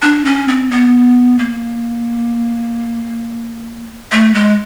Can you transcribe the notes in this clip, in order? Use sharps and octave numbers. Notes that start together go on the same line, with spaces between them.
D4
C#4
C4
B3
A#3
A3
G#3